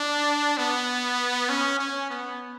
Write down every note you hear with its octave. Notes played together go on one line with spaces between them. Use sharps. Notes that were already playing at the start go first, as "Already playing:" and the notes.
Already playing: D4
B3
C#4
C#4
B3